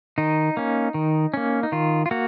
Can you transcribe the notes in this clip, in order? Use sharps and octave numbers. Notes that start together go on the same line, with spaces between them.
D#3 D#4
A#3 C#4
D#3
A#3 C#4
D#4
D#3 F4
F4
A#3 F#4